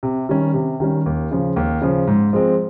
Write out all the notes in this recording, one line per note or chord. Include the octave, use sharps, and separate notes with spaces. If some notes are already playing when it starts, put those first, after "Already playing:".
C3
D#3 G3 C#4
C3
D#3 G3 C#4
D#2
C#3 F3
D#2
C#3 F3
G#2
F3 G#3 C4